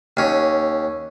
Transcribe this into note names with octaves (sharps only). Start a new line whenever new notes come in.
D#2 C#4